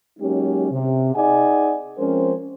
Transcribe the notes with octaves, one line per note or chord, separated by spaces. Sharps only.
F#3 G#3 A#3 C#4 D#4 G4
C3
D#4 G#4 D5 D#5 F#5 G#5
F3 G#3 C4 C#4 A#4 C5